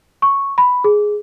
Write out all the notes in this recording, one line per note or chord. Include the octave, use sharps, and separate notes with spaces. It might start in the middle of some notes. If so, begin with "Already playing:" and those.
C#6
B5
G#4